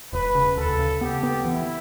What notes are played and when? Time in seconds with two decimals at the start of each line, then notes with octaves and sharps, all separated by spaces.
0.13 E1 B4
0.35 C#3
0.57 D2 A4
0.79 C#3
1.01 B3 G4
1.23 B3
1.45 E3 E4